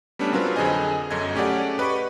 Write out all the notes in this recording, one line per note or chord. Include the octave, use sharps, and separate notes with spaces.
G3 A3 B3 C#4 D4
F#3 C4 F4 G4 A#4 B4
F2 D3 G#4 C5 D#5 G#5
G1 F#2 A4 D#5 G#6
A3 C#4 G4 G#4 D5 F#5
G4 B4 D#5 B5 C#6